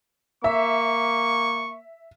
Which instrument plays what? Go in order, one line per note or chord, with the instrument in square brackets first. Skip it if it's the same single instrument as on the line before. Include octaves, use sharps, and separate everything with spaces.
[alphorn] A#3 [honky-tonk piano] E5 [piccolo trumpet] C#6